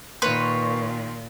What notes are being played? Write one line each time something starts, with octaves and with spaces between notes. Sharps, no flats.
A#2 D#3 B4 C#5 C6